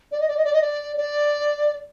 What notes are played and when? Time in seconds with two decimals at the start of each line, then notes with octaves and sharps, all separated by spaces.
0.12 D5
0.20 D#5
0.28 D5
0.37 D#5
0.44 D5
0.54 D#5
0.61 D5
0.97 D5